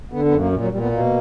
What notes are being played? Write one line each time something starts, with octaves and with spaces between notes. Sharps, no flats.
D3 B3
B3
F#2
A#3
A#2
F#3
A#2 G3
B3
B2 A#3